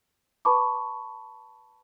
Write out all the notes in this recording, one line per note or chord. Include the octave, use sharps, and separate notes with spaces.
B4 A5 B5 C#6 D6